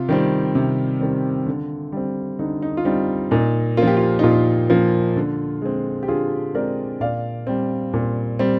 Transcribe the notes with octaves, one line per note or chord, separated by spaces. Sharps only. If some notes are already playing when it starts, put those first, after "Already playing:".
Already playing: C3 F4
D#3 G3 C4
C3
D#3 G3 C4
D3
G3 C4
D3 D#4
D#4
F4
G3 C4 D#4
A#2 D#4
F3 A#3 F4
G4
F4
D#4
A#2 F4
F3 A#3
D3
G#3 C4
G4
D3 F4 G#4
G#3 C4 A#4 D5
A#2 D5 F5
G3 C4
A#2
G3 C4